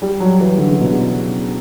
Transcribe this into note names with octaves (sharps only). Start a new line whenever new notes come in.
G3
F#3
E3
D3
C#3
B2
C#3